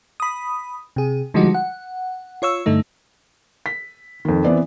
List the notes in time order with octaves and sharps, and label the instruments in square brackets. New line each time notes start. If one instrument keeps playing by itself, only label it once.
[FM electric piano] B5 D#6
C3 G#4
D3 F3 G3 G#3 D#4 F#4
F#5
F4 C#5 C#6 E6
G2 D3 A3 D#4
[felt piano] B6
F2 D#3
E3 B3 C4 D5